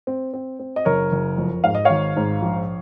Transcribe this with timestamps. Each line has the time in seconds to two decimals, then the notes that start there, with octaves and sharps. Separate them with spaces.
0.07 C4
0.34 C4
0.59 C4
0.76 D#5
0.85 F#1 A#4 C#5
1.12 F#1
1.38 F2
1.64 G#2 F5
1.75 D#5
1.85 G#1 C#5 F5
2.16 G#2
2.42 A#1